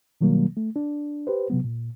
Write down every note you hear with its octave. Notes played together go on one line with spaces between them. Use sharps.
B2 D#3 F#3 G3 A#3
A3
D4
G4 B4 C5
C3 F#3 B3
A#2